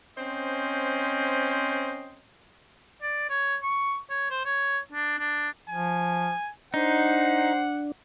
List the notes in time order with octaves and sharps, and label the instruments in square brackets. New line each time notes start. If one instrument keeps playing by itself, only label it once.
[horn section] C4 C#4 C5 D#5
[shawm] D5
C#5
C#6
C#5
C5
C#5
D4
D4
[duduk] F3 [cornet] G#5
[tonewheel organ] D4 [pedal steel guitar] D#4 [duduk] C5 [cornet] F#5